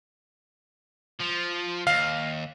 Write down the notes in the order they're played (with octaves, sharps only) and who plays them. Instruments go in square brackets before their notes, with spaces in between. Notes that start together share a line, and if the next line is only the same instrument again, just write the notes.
[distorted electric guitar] F3
[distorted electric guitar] D#2 [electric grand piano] F5